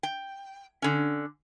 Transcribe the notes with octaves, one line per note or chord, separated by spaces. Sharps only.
G5
D3 C#4